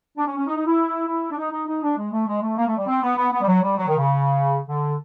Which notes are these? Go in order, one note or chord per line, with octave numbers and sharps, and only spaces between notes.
D4
C#4
C#4
D#4
D#4
E4
E4
D4
D#4
D#4
D#4
D4
G#3
A3
G#3
A3
A#3
A3
G3
C4
B3
B3
B3
G3
F#3
G3
F#3
D#3
C#3
D3